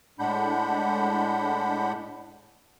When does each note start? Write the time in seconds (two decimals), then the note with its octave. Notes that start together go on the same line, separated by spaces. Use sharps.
0.19 A2 G#3 D4 F#5 B5 G6